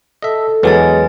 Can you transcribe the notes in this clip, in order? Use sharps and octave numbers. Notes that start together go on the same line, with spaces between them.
A4 D#5 E5
E2 F#3 G#3 B4 G#5 A6